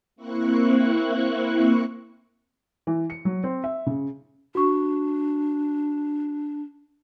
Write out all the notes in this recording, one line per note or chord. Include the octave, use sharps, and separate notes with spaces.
A#3 C4 E4 C#6 F#6
E3
C#7
F#3
C4
E5
C#3
D4 F#4 C#6